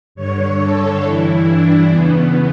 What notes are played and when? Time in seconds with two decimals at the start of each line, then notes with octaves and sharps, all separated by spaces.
0.15 G2 D3 C#5
0.60 A4
1.03 G2 E3 E4
1.48 D4
1.90 E2 C#3 E3 B3